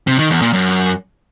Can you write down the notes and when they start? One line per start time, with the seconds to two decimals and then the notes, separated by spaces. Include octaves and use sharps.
0.07 C3
0.19 D#3
0.30 E2
0.42 A#2
0.53 F#2